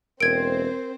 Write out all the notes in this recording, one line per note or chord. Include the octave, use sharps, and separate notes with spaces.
E1 C4 A#4 C5 G#6 D7